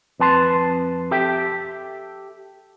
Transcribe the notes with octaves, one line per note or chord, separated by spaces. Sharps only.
F2 B4 A5 C6
G4 A4 E5 G5